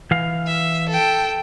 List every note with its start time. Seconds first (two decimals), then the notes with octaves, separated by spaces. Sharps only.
0.11 E3 F5
0.46 E5
0.89 A4 G5